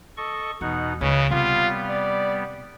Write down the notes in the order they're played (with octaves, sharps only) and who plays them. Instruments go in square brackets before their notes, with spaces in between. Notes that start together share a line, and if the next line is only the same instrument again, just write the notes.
[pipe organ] A4 D#5 C#6
[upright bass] E2 [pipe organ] B2 D#4 F#5
[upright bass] C#2 [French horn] C#3 [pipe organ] B4 C#5 D#5
[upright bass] C3 [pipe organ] G3 B3 [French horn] F4
[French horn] D5